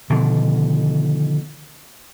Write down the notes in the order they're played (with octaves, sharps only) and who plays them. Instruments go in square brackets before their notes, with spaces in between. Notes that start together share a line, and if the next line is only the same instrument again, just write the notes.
[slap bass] B2 D3 D#3 F3